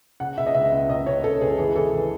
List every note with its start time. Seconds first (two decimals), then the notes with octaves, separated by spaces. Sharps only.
0.20 C#3 F#5
0.38 C#3 E5
0.47 D#5
0.54 C#2 E5
0.72 C#2
0.90 C#2 D#5
1.06 C#2 C#5
1.24 C#2 A4
1.41 C#2 G#4
1.58 E3 G#4
1.75 E3 A4
1.93 E3